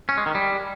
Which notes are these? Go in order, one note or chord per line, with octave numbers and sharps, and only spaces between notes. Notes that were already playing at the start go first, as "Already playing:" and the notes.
C#4
G#3
D#3
G3